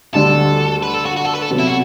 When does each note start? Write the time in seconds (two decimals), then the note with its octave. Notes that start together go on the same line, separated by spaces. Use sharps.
0.14 D2 D3 G3 D4 A4
0.83 B4
0.94 A4
1.05 F#4
1.17 F#4
1.25 A4
1.33 B4
1.42 A4
1.51 C3 F#3 B3
1.59 E4
1.67 F#4